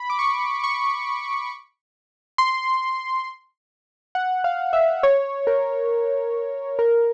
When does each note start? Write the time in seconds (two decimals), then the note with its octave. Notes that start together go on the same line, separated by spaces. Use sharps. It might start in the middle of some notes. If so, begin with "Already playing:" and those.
Already playing: B5
0.10 D6
0.19 C#6
0.64 C#6
2.38 C6
4.15 F#5
4.44 F5
4.73 E5
5.03 C#5
5.47 A#4
6.79 A#4